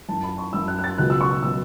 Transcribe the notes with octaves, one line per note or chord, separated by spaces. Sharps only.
F#2 E3 A5
B5
C#6
F#2 E3 E6
F#6
F#6
A6
C#2 B2 F#3 F#6
E6
C#6
E6
B2 F#3 E6